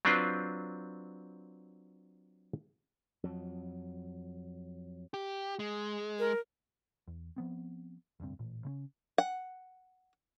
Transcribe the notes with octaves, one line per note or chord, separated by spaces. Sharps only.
F#3 C4 D4 F4 B4 C5
F2 F#3
G4
G#3
A#4
E2
F3 B3 C4
F1 D2 G2 C4
A1 A#2
C#3 C4 C#4
F#5